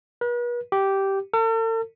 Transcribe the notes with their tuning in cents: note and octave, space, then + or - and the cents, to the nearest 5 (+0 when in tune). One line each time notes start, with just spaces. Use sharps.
B4 -40
G4 -10
A4 +45